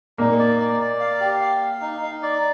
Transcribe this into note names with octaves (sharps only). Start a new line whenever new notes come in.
A#2 A#3 D#4
D5
D5
D5
F5
G4
F5
F5
D#4
D#4
D5